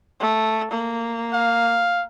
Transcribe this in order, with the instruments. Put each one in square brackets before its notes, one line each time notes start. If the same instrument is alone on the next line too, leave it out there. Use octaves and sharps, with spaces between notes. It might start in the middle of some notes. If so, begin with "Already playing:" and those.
[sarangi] A3
A#3
[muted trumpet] F5